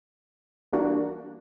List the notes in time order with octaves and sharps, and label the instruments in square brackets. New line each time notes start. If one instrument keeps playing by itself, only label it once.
[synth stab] E3 G3 A#3 D4 F#4